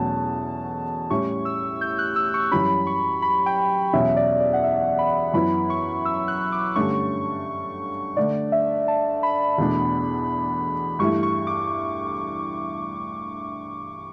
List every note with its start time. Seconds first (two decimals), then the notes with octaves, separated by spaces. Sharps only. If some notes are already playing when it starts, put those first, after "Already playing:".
Already playing: E2 B2 F#3 A3 C#4 A5
1.10 A2 G3 C#4 E4 C#6
1.45 E6
1.81 G6
1.98 F#6
2.16 E6
2.34 C#6
2.52 F#2 E3 G3 C#4 B5
2.87 C#6
3.22 B5
3.46 G5
3.93 E2 B2 F#3 C#4 E5
4.17 D5
4.41 D5
4.54 F#5
4.64 E5
4.99 B5
5.34 F#2 E3 B3 E4 B5
5.70 C#6
6.05 E6
6.28 F#6
6.52 D6
6.76 G2 D3 A3 C#4 C#6
8.17 D3 A3 D4 D5
8.52 E5
8.88 A5
9.23 B5
9.58 E2 B2 A3 D4
10.99 G2 E3 A3 E4 C#6
11.23 C#6
11.47 D6